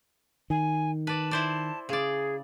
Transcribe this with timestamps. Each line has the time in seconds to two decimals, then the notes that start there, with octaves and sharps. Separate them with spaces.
0.50 D#3 G#5
1.07 B4 D5 A5
1.31 E4 C5 D5
1.89 C#3 G#4 D5